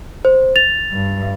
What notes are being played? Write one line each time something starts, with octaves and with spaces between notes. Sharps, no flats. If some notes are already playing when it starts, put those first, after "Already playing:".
C5
A6 F7
G2